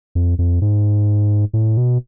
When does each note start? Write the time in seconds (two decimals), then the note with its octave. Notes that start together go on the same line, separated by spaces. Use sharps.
0.15 F2
0.39 F2
0.62 G#2
1.53 A2
1.77 B2